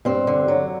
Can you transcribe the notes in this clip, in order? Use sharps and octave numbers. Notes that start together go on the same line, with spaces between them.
G2 C4
D3
F#3